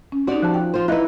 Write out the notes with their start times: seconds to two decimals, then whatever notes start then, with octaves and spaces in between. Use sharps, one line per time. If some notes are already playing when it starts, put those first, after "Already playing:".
0.12 C#4
0.27 C4 D#4 F#4 G4 D5
0.42 F3 A5 F#6
0.54 G5
0.74 F4 C5
0.88 D#4 E4 B4 D#5 F5 F#6